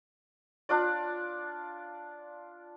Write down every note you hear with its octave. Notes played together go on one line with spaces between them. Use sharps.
D4 F4 D5